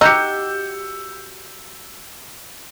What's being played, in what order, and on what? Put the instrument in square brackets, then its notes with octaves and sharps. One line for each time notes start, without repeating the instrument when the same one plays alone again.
[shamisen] D#4 [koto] F#4 G4 [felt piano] E6 G6 C#7